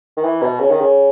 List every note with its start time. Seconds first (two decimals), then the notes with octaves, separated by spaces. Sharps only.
0.17 D#3
0.24 E3
0.42 B2
0.60 C#3
0.71 D#3
0.81 C#3